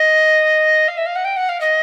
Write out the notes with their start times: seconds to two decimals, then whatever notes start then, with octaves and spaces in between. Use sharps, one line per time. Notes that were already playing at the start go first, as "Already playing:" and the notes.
Already playing: D#5
0.88 F5
0.97 E5
1.06 F5
1.15 F#5
1.24 G5
1.36 F#5
1.48 F5
1.60 D#5